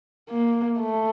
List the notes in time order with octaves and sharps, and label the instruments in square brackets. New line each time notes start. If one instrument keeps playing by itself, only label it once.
[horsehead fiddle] A#3
A3